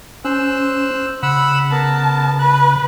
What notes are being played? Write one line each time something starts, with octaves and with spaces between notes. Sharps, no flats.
C#4 C5 E6 F#6
C#3 F#5 B5 E6
B3 A#4 A5
B4 F#6